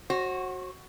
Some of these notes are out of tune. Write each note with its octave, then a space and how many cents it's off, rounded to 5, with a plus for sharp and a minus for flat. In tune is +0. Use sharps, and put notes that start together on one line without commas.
F#4 +0 C5 +45